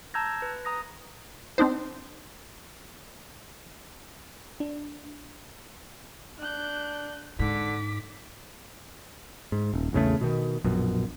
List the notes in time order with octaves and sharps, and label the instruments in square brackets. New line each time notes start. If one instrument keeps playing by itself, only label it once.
[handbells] A5 A#5 E6 G6 G#6 A#6
B4
A#5 D#6 A#6
[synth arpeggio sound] C4 D4 D#4 C5
[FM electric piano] D4
[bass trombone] D4 [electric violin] F#6 G6
[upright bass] G#2 [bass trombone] D3 [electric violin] D6 B6
[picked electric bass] G#2
D#1
A#1 E2 C#3 A3
B2 D#3
A#1 F#2 B2